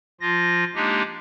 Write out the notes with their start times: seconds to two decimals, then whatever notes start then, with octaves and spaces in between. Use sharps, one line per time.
0.21 F3 F4 A#6
0.75 G#3 A#3 D4 D#4 G4